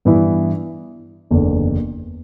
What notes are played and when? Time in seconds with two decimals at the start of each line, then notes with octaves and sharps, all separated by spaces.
0.05 G2 E3 B3 E4
1.31 F#1 E2 D3